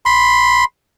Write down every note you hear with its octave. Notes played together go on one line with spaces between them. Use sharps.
B5 C6